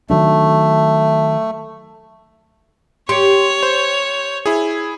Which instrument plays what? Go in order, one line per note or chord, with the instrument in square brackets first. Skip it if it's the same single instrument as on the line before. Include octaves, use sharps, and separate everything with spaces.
[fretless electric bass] D#3 F#3 D4 [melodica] A3
[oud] G4 [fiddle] C#5 [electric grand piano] C6 C#7
[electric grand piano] C5
E4 G#4